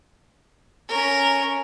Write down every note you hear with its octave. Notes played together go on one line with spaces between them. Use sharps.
C#4 A#4